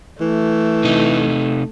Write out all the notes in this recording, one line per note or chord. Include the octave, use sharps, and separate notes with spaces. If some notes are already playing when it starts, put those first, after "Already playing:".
E3 A3
C3 D#4